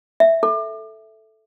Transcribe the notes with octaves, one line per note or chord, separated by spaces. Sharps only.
E5
A4